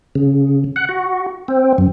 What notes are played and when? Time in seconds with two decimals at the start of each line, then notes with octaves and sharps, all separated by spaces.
0.15 C#3
0.76 F#5
0.89 F#4
1.48 C4
1.78 F#2